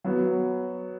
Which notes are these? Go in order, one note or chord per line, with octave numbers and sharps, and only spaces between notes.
F#3 B3 F#4